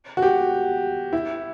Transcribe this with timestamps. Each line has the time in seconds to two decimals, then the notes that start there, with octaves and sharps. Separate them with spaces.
0.17 F#4
0.22 G4
1.13 E4